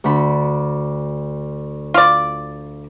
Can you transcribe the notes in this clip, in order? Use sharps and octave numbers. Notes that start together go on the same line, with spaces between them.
D2 D3 B5
F4 D5